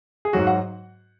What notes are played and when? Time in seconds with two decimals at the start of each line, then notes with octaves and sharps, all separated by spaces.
0.25 G#4
0.33 G#2 F#3 F#4
0.47 F#5